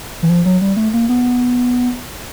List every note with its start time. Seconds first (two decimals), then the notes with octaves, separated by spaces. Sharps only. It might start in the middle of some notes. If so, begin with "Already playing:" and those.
0.23 E3
0.29 F3
0.45 F#3
0.61 G3
0.77 A3
0.94 A#3
1.09 B3